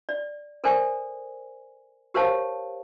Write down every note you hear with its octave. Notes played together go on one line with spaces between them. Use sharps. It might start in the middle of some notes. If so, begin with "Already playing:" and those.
D5
A4 A#4 C5 D5 G#5
G4 A#4 C5 C#5 F5 A5